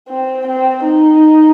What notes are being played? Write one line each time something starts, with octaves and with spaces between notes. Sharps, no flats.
C4
C4
D#4